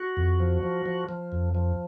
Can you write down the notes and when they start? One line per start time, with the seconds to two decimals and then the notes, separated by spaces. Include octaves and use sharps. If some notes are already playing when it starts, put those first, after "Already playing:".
Already playing: F#4
0.17 F2
0.40 F3
0.63 F3
0.86 F3
1.09 F3
1.32 F2
1.55 F3